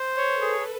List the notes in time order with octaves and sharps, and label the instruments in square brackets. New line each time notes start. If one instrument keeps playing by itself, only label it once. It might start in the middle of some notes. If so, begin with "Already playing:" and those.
Already playing: [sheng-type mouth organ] C5
[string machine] A4 B4 [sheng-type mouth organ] C#5
[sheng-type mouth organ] G#4